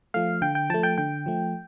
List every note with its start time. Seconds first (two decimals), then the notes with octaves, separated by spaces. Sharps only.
0.14 F3 A3 F5
0.42 D3 G5
0.55 G5
0.70 F3 A3 A5
0.83 G5
0.98 D3 G5
1.26 F3 A3